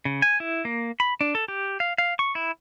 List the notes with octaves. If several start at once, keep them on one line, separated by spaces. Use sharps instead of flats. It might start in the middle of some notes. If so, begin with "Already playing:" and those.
C#3
G#5
E4
A#3
B5
D4
A4
G4
F5
F5
C#6
E4